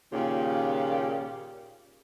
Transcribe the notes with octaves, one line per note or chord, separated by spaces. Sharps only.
D#2 A#2 C#3 F4 G4